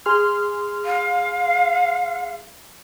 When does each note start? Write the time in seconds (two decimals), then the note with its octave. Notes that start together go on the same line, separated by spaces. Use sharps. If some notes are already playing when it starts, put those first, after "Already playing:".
0.06 G#4 C6 F6
0.85 F5